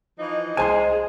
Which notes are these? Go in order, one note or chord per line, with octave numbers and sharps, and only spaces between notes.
E3 F3 D#4
C2 G#3 G#4 C5 D#5 G#5 A5 C6